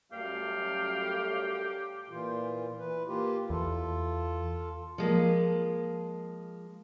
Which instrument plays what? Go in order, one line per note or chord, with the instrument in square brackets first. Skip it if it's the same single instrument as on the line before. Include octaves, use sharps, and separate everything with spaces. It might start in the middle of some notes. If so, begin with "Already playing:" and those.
[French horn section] F#2 G3 A3 [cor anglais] G4 [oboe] F5
[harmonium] A#2 E3 F4
E3 B4
A#3 F4 G4
[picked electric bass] E2 [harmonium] F4 A4
[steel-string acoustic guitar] F3 G#3 A#3